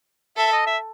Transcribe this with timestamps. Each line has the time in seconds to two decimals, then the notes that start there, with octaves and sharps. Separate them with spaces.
0.37 A4 E5
0.52 D#5
0.67 E5